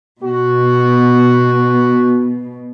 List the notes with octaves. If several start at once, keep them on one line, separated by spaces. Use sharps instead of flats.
B2 F#4